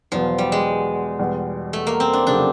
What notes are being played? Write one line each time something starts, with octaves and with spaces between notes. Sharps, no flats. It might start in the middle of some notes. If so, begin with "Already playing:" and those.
E2 B2 F3 F#3 B3
G3
G#3
E2 B2 G3
A3
A#3
C4
D4
F1 C#3 F#3 D4